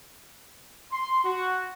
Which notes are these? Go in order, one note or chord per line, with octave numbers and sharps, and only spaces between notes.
C6
F#4